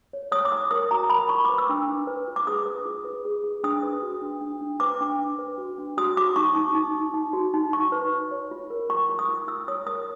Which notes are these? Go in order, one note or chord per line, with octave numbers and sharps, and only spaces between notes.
C#5
C#5 D#6
D6
C#5 D#6
A#4 D#6
F#4 A#5
A#4 B5
F4 C#6
B4 D6
E6
D4
D4
B4
F4
D6
G#4 D#6
B4
F4
B4
G#4
G#4
D4 D#6
B4
F#4
D4
D4
D4
B4 D6
D4
D4
B4
F#4
D4
F#4 D#6
F#4 D6
D#4 C#6
D#4
D#4
D#4
D#4
F#4
D#4
D#4 C#6
B4
B4
C#5
F4
A#4
F4 C#6
F4
D#6
F4
F4 E6
C#5 D#6
A#4 D#6